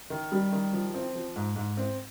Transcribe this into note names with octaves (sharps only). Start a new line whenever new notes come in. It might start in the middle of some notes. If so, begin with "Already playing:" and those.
D#3
G3
D#3
F3
C4
F3
G#2
G#2
C4